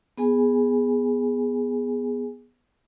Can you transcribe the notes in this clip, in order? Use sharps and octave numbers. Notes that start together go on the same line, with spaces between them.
B3 G#4 G#5